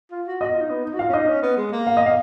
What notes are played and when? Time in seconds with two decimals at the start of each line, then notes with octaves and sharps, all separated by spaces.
0.11 F4
0.27 F#4
0.41 F#4 D#5
0.51 F4
0.60 D#4
0.71 B3
0.84 D#4
0.94 F#4
0.99 F4 F5
1.08 C#4
1.13 D#4 D#5
1.28 C#4
1.42 B3
1.57 G#3
1.72 A#3
1.87 F5
1.97 D#5
2.06 F5